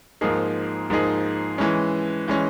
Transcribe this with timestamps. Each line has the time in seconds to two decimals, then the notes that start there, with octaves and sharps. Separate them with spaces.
0.21 G#2 F3 A#3 D#4 G#4
0.90 G#2 F3 A#3 D#4 G#4
1.58 E3 G#3 C#4
2.28 E3 G#3 C#4